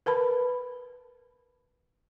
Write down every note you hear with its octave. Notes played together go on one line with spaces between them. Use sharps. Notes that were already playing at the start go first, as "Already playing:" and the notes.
A#4 B4 A5 B5